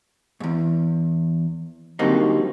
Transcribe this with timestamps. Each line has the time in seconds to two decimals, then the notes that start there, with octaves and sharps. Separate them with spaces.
0.40 E2 G#2
1.99 D3 F#3 G3 A#3 C4 D#4